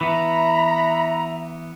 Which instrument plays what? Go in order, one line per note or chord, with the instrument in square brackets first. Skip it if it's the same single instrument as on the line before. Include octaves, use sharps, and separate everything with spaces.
[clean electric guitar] E3 B3 [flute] E5 [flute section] A#5 [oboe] B5